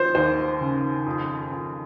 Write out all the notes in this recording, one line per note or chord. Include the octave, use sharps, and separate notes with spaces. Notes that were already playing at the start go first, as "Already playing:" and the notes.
Already playing: F3 C5
D#2 C5
C#3
F2
F2